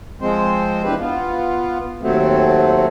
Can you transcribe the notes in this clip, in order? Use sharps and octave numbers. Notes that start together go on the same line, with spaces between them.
F3 G#3 C4 C5
E2 D3 E3 G4 B4
B3 F4
D#2 F#3 A3 C4